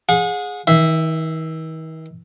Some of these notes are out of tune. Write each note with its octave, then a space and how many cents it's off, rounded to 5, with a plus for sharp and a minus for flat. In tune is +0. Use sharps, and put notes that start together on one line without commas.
G#4 +0 F#5 -40
D#3 +45 E5 +0